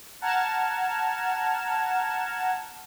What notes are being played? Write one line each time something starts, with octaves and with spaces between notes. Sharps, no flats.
F#5 A5 A#5 F6 G#6 E7